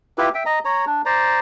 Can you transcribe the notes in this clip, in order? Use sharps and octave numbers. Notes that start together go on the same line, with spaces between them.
E4 F4 G4 B4
E5 G5
D#5 A#5
C#5 A#5
D4
C5 D5 A#5